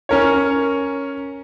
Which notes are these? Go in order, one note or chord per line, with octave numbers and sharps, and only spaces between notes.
C#4 A#4 C#5